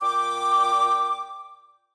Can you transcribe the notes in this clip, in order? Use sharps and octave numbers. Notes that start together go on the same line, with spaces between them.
A#2 G5 D6